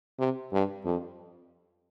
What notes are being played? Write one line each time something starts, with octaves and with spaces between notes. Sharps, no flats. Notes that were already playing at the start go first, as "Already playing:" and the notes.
C3
G2
F2